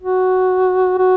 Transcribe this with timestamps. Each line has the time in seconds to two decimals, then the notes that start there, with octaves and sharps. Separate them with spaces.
0.02 F#4
0.99 F#4